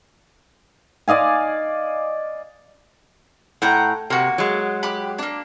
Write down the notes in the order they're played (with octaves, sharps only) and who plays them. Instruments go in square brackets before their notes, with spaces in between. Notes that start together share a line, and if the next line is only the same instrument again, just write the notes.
[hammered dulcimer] D5 D#5 F5 G#5
[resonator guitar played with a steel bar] A2 [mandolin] F#5 G5 A#5
[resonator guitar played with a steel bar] C3 [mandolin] A#3 F#4
[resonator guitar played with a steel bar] F#3 G#3
[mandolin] G4 B5
A#3 D4